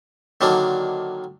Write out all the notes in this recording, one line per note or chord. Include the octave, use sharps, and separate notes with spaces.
D3 D#3 F#3 A#3 D4